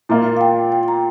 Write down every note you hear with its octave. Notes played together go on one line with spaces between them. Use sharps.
A#2 A#3 F4 A#5
F5
G5
G5
G5
A#5